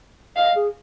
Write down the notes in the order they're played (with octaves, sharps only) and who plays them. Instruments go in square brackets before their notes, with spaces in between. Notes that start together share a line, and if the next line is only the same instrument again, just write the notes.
[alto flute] D#5 [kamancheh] F5
[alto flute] G#4